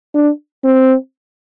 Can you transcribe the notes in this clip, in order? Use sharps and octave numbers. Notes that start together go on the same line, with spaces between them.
D4
C4